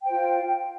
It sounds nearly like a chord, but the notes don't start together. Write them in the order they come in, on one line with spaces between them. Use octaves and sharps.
G5 C5 F4